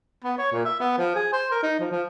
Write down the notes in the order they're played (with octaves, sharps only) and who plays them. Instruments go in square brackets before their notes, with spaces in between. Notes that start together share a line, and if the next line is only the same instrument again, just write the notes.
[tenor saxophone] B3
C#5
A#2
E5
B3
F3
G#4
C5
A#4
D#4
F3
F3